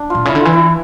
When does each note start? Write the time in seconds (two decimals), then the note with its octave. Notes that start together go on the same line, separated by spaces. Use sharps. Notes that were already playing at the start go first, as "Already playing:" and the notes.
Already playing: D4
0.10 A#2 F4
0.25 C#3 E4
0.35 D3
0.41 E3 F4
0.53 E4